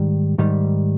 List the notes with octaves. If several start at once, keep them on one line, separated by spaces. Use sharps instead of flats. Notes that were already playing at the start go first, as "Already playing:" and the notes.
Already playing: G#2 D#3 G3
G#2 D#3 G3